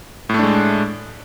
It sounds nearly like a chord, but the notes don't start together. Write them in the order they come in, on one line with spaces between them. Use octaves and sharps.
A2 A3 D4 G#3